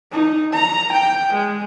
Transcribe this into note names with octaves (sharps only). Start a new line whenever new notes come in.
D#4
A#5
G5
G#3